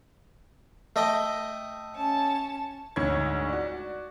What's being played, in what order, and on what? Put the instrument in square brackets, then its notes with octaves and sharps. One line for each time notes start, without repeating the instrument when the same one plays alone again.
[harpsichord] A3 D#5 G5
[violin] C#4 A5
[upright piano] D2 G#2 D#4 C#5 G#6
F#4 D5